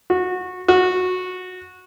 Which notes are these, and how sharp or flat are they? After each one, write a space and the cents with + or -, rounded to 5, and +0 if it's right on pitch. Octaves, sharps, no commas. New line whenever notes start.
F#4 -20
F#4 -15